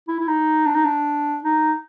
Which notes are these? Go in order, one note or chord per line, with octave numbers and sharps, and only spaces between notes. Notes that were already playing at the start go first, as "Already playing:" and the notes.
E4
E4
D#4
D4
D#4
D4
D#4